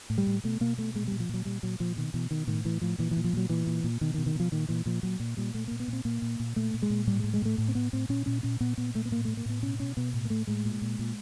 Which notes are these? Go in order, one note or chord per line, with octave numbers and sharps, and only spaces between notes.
A2
G3
A2
B2 A3
B2 A#3
B2 A3
A#2 G#3
G3
A#2
F3
A#2 F#3
A#2 G3
A#2 F#3
A#2 F3
B2 D#3
B2 E3
B2 D#3
A2 D#3
A2 E3
A2 F3
A#2 E3
E3
A#2
F3
A#2 F#3
A#2 E3
A#2
A#2
B2 D#3
D#3
B2
D#3
B2 F3
A#2 D#3
A#2 E3
A#2 F3
A#2 F#3
A#2
A#2 G3
A#2 A3
A#2 A#3
B3
A#2
C4
A#2 A#3
A#2
A#2
A#2 A3
A#2
G#3
A#2
A2 G3
G#3
A2
G#3
A2 A3
A2
C4
A2 B3
A2 C4
A#2 C#4
A#2 C#4
A#2 C#4
A#2 B3
A#2 B3
A#2 A3
B3
A2 A#3
A2 A3
A#3
A2 B3
B2 C#4
B2 C#4
B2 B3
A2
A#3
A2 A3
A2 G#3
A#2
A#2
A#2